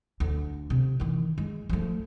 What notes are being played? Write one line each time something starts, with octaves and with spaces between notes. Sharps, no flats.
D2
C3
D#3 E3
G#3
F3 A3